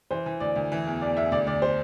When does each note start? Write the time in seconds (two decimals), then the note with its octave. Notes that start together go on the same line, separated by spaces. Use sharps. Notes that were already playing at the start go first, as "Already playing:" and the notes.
0.11 E3 C5
0.26 E3
0.40 D2 D5
0.56 D2
0.72 E3
0.87 E2
1.01 E2 D5
1.17 E2 E5
1.32 D2 D5
1.47 D2 D5
1.62 C5